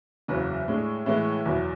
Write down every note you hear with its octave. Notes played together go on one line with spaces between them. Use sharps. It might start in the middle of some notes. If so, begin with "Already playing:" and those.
F#1 E2 C#3 F#3 B3
A2 G#3 D4
A2 E3 G#3 B3
F#1 E2 B2 F#3 B3